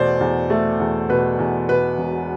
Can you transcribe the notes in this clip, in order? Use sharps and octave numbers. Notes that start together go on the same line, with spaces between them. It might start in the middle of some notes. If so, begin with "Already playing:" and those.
Already playing: E2 B2 A3 C5 D5
E2
A3
E2
B2 B4
E2
B2 B4
E1